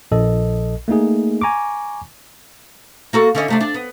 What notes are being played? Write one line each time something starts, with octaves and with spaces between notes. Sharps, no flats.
A#1 A4 D#5
A3 A#3 D#4 G#4
G#5 A#5 C#6 D6
A#3 F#4 A4
D3 C#4 D#5
C3 A3 D4
D4
B3